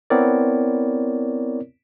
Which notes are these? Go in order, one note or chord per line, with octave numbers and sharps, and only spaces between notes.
B3 C4 E4 A#4 C#5 D5